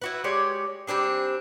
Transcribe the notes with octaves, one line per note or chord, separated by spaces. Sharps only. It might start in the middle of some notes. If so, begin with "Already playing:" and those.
E4 F#4 B4
G#3 G4 C#5 D5
G3 C4 D4 G#4